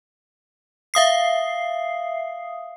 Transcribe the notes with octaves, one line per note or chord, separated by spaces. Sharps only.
E5 F5 D#6 C7